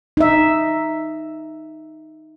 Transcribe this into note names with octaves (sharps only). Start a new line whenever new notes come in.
D#4 E5